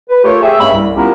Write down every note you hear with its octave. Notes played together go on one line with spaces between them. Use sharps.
B4
A3 F4 G4 A4 A#4 C#5
G4 G#4 E5
G2 G#3 A#3 C#4 C#5 B5
C2
B3 C#4 E4 F4 G4 A#4